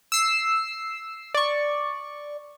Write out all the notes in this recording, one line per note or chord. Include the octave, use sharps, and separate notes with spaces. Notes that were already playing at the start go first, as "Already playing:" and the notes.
E6 C7
D5 C#6